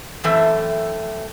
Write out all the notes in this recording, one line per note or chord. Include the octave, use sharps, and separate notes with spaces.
F#2 E3 A3 C4 E5